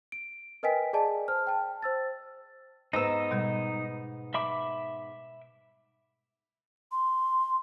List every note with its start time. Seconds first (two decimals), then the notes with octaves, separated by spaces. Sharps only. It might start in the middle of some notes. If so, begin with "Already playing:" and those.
0.12 D7
0.63 A#4 B4 D#5 G5 G#5 B6
0.93 G#4 D5 D#5 G#5 A5
1.28 C5 F6
1.47 G5 A5
1.82 C5 E6 A6
2.93 G#2 B3 D#4 A#5 E6
3.31 B2 G3 G#3
4.34 E5 B5 D6
6.92 C6